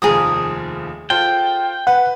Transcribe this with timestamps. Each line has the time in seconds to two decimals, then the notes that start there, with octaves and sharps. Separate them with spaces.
0.02 F1 D#2 F3 G#4 A#5 D#6
1.10 F4 A4 C5 G5
1.87 B4 F#5